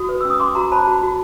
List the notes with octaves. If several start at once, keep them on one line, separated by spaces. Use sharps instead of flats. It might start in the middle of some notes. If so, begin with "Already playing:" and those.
Already playing: F#4 D#6
B4
C#4 E6
D#6
C#4 C6 D6
F#4 A#5 C6
C5 A5 B5
F#4
F#4